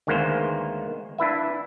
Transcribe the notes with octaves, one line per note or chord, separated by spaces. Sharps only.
D2 D#3 G#3 A#3 B3 C5
D4 E4 B4 E5